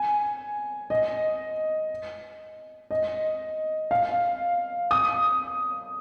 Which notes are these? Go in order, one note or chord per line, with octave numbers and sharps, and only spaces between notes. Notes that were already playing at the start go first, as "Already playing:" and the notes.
Already playing: G#5
D#5
D#5
F5
D#6